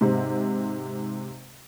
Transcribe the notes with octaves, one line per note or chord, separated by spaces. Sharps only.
G#2 C3